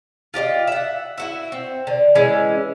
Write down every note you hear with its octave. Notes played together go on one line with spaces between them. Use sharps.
F4 G4 D5 D#5
E5 F#5
E4 F#4 E5
C4
D3
E3 G#3 C#4